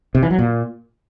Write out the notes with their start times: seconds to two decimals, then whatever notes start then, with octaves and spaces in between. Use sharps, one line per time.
0.15 C3
0.23 E3
0.31 F#3
0.39 A#2